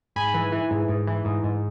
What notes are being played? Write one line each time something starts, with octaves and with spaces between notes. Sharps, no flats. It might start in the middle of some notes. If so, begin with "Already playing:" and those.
G#2 G#5 B5
E3
E3
G#2
G#2
E3
G#2
G#2